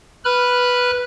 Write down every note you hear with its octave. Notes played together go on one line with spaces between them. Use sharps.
B4 B5 F6 F#6